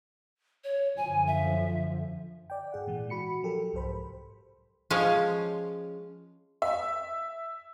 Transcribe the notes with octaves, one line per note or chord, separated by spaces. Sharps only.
C#5
F#2 D3 F3 G#5
E5
D5 G5
G#2 G#4 F#5
A#2 E3 G#3
F#4 B5 C#7
F3 F#3 G4 A4 A#4
C2 G#2 C5 B5
F3 G#3 C#4 C#5 F5
E5